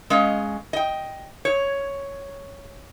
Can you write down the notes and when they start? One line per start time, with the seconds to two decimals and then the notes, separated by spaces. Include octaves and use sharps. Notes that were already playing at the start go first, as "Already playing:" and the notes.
0.10 G#3 C#4 D#5 F5
0.73 D#5 G5
1.45 C#5